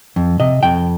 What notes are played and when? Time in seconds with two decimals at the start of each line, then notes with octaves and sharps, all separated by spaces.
0.16 F2
0.40 C3 D#5
0.63 F2 G5